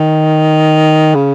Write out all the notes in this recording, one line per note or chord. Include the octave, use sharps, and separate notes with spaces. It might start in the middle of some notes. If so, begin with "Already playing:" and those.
Already playing: D#3
C#3